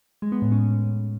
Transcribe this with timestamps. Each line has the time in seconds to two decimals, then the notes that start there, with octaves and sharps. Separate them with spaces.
0.22 G#3
0.32 B3
0.42 A2
0.52 C#4